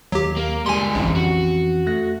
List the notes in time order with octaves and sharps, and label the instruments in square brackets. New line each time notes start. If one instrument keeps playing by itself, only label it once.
[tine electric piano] D#2 [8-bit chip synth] F#3 G4
[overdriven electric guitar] A#3
[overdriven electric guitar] D3 G3 [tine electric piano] G#3 [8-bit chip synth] G#5 C6
[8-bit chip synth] A#1 [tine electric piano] F2 E3 C#4
[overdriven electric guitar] F#4
[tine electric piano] A3 F#6 A#6